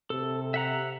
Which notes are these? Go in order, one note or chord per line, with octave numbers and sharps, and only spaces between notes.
C3 A4
E5 F#5 A#5